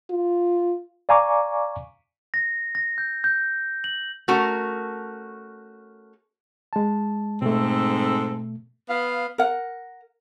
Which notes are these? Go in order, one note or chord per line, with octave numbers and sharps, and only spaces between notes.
F4
D5 F5 G#5 A#5 C#6 D6
A#6
A#6
G6
G6
F#7
A3 C#4 F#4 A#4
G#3 A5
G#2 B2 A3 C4 A4
B3 F5
A#4 F#5